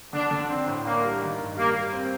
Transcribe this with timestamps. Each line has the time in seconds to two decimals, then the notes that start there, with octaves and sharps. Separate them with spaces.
0.13 D3 D4
0.31 D3
0.49 C4 D4
0.68 A2
0.85 A#3 D4
1.04 G3
1.22 D#3
1.39 G2
1.56 G3 A#3
1.74 G3
1.92 C4